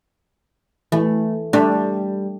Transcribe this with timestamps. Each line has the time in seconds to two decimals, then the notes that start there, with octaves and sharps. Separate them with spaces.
0.92 E3 A3
1.53 G3 A3 D4